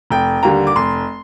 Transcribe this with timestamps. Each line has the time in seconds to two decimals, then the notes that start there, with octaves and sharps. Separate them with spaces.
0.11 F1 G5
0.43 D#2 D3 G3 A#5
0.67 D6
0.76 F1 C6